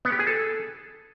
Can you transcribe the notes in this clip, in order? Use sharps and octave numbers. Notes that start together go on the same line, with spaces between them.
B3
G4
G#4
A4